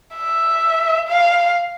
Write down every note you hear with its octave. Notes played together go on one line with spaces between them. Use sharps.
E5
F5